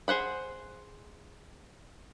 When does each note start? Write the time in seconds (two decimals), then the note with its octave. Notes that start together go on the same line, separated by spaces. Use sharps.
0.08 G#4 C5 F#5 B5